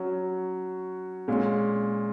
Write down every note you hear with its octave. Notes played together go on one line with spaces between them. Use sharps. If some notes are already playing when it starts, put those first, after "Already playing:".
Already playing: F#3 C#4 F#4
A#2 G#3 C#4